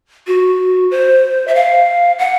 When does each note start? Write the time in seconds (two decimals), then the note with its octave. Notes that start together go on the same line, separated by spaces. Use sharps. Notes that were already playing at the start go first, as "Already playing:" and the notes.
0.27 F#4
0.91 C5
1.48 E5
1.55 F5
2.19 F#5